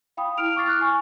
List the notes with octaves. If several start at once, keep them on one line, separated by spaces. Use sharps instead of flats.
F5 G5 B5 D#6
E4 G5 F6 D7 F7
C#6 D6 F6 A6 C7
F6 F#6
G#5 C#6